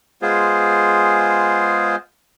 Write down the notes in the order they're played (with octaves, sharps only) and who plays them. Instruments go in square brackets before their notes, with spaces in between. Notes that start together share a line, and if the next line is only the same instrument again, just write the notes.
[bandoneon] G#3 B3 F4 G#4 C5